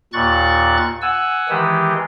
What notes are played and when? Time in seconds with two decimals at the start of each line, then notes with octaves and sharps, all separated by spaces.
0.13 D#2 A#2 C#6 F#6 A6
1.02 F#5 G#5 E6
1.49 D#3 E3 G#3 G4